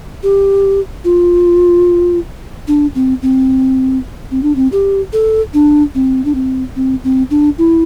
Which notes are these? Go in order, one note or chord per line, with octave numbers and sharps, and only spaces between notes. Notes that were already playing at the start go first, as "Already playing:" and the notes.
G4
F4
D4
C4
C4
C4
D4
C4
G4
A4
D4
C4
D4
C4
C4
C4
D4
E4